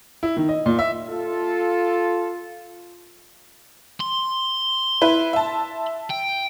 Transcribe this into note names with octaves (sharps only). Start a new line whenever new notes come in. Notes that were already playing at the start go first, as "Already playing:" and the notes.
E4
D#3
D#5
A#2
E5
F4 A4
C6
E4 B4
E5 A5
G5